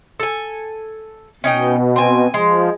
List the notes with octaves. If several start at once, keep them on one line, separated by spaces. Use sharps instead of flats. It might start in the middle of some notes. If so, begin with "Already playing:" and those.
A4 G#5
B2 C#4 D#4 G5
C4 G#5
F3 G#3